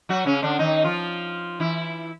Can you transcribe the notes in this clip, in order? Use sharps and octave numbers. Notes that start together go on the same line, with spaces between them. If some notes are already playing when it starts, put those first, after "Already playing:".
F#3 F#4
C#3 C#4
D3 D4
D#3 D#4
F3 F4
E3 E4